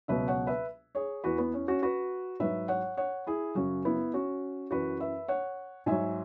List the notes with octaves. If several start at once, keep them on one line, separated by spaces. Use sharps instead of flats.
C#2 B2 F#3 B4 E5
C#5 F#5
B4 E5
G#4 C#5
E2 E3 F#4 B4
B3
C#4
C#4 F#4
F#4 B4
G#2 F#3 B4 E5
C#5 F#5
C#5 F#5
E4 G#4
F#2 C#3 F#3 C#4 F#4
B3 E4
C#4 F#4
F#2 E3 F#4 B4
B4 E5
C#5 F#5
G#2 F#3 E5 G#5